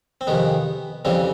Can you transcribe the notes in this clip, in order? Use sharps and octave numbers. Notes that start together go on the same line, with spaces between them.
C4
F2 C3 D#3 G#3 B3
F2 C#3 E3 G3 C4